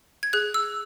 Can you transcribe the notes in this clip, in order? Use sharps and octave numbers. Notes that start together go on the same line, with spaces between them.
G#6
G#4 F#6
E6